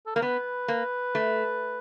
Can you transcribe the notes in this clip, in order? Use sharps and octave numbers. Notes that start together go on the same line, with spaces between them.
A4
A#3 A#4
B3 B4
A#3
A3